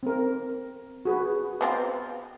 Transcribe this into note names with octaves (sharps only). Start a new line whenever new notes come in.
C4 A#4
F#4 G#4 B4
B3 C4 F4